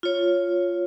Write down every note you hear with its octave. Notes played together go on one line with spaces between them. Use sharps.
F4 C#5